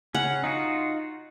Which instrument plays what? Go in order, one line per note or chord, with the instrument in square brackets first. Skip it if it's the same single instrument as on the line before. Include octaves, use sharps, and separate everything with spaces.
[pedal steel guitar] C#3 C#4 [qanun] F#5
[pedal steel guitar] D#4 F4 F#4